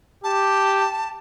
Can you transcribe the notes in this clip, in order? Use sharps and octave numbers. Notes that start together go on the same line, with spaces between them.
G4 A5